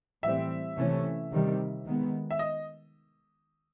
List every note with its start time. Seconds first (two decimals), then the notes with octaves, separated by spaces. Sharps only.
0.23 A2 E3 G3 C4 E5
0.77 C3 E3 A3 C#4
1.31 C3 D#3 G3
1.85 D#3 G#3 B3
2.31 E5
2.39 D#5